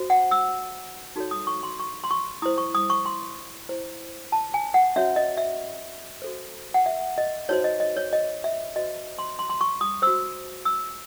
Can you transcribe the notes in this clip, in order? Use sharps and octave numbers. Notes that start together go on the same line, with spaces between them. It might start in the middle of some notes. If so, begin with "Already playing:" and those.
Already playing: F#4 C5
F#5
E6
D#4 F#4 A4 C#5
D#6
C#6
C6
C#6
C6
C#6
E4 C5 D#6
C#6
D#6
C#6
C6
E4 C5
A5
G#5
F#5
C#4 F#4 C#5 E5
D#5
E5
F#4 A4 C5
F#5
E5
D#5
D#4 F#4 C5 C#5
D#5
D#5
C#5
D#5
E5
F#4 C5 D#5
C6
C6
C6
C#6
D#6
F#4 C5 E6
E6